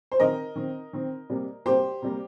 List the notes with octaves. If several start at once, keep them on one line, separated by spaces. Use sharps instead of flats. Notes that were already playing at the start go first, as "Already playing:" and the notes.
C5
D#3 C4 A#4 D#5
D#3 C4
D#3 C4
C3 G3 A#3
C3 G3 A#3 G4 C5
C3 G3 A#3